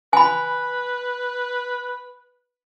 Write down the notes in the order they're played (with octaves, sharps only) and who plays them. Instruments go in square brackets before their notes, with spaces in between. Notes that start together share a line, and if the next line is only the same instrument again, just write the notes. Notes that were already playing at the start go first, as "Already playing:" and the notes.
[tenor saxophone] B4 [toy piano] G#5 B5